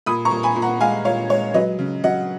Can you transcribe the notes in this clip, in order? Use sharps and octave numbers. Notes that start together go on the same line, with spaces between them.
A#2 B5 D#6
A#5 C#6
A#2
G#5 B5
A#2
F#5 A#5
G#3 F5 G#5
A#2 C#5 F5
G#3 C#5
F#3 B4 D#5
C#3
F#3 D#5 F#5